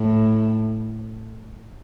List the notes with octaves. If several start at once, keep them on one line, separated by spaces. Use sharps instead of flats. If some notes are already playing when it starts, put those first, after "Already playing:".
Already playing: A2